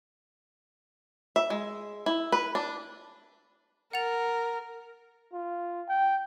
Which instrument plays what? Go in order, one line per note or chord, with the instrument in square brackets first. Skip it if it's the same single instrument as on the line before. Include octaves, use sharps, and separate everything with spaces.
[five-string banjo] E5
G#3
E4
B4
D4
[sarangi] A#4 [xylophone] F#5 A6 F7
[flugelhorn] F4
G5